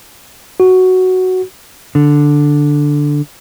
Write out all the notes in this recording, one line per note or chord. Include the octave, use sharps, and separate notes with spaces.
F#4
D3